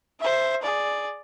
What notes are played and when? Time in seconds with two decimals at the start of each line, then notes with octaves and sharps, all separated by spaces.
0.20 C5 E5
0.62 G#4 D5